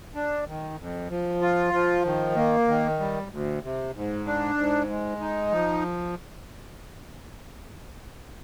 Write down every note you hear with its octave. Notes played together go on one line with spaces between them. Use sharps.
D4
D#3
F2
F3
F4
F3
D#3
A#3
D#3
G3
D2
C3
G#2
D4
G#2
G#3
D#4
F3